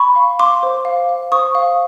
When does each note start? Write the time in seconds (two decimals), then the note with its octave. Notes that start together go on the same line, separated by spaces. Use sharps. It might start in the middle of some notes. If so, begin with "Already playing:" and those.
Already playing: B5 C#6
0.16 F5
0.39 F5 C6 D6
0.63 C5
0.85 F5
1.09 F5
1.32 C5 C#6 D#6
1.55 F5